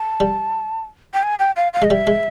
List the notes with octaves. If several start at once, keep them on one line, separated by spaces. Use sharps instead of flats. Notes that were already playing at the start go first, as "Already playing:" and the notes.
Already playing: A5
G3
G5
G#5
G5
F5
F5
G#3 D#5
G3 E5
G#3